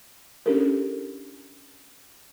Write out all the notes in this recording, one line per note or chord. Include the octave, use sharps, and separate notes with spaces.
C#4 D4 E4 G4 A4 A#4